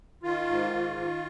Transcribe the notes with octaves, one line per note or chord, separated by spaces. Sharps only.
D#3 F4
G#2
D#3
D#3